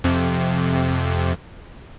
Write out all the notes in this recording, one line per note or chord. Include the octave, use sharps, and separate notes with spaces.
F2 C3